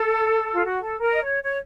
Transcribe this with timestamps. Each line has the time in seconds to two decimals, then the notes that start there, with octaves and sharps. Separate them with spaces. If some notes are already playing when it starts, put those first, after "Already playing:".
Already playing: A4
0.53 F4
0.65 F#4
0.79 A4
1.00 A#4
1.12 D#5
1.21 C#5
1.43 C#5